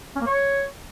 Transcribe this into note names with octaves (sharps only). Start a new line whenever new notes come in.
C#4
A#3
C#5